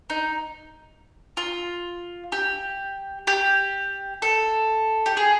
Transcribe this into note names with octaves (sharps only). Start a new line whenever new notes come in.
D#4
F4
G4
G4
A4
G4
G#4